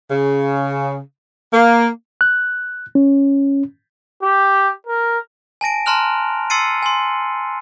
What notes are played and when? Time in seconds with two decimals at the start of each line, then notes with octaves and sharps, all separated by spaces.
0.11 C#3
1.54 A#3
2.21 F#6
2.95 C#4
4.23 G4
4.87 A#4
5.61 G#5 A5 A#6 D7
5.86 A5 A#5 C6 F6 F#6 F7
6.50 C6 E6 A6 C7 C#7 D#7
6.83 G#5 C6